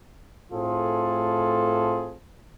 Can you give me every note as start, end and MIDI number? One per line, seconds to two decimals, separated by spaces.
0.52 2.15 45
0.52 2.15 57
0.52 2.15 60
0.52 2.15 65
0.52 2.15 68
0.52 2.15 69